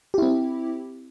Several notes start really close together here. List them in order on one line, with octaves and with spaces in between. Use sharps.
G4 E4 C4